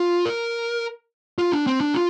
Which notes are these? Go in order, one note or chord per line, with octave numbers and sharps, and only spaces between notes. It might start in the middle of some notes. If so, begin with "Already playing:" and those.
Already playing: F4
A#4
F4
D4
C4
D4
F4